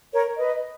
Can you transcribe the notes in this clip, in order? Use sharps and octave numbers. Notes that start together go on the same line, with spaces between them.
A#4 C#5
B4 D#5